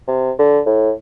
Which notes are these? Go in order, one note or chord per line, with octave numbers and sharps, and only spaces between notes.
C3
D3
A2